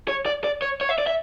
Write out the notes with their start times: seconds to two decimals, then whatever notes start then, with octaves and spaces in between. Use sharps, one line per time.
0.08 C#5
0.26 D5
0.44 D5
0.62 C#5
0.81 C#5
0.89 E5
0.98 D5
1.07 E5